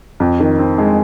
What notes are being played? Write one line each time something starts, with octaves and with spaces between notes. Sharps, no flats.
F2
D#3
C4
G#3